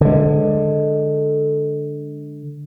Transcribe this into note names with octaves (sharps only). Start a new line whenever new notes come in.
D3 G#3